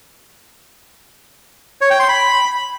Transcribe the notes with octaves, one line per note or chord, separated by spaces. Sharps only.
C#5
G5
C6
B5